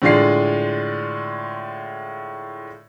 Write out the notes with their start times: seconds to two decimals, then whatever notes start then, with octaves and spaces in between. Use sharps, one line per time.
0.02 A2 D3 G#3 F4 D5 C7